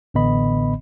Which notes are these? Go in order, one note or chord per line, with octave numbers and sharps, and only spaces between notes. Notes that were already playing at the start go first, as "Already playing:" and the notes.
A1 A2 D3 B3 D#5 B5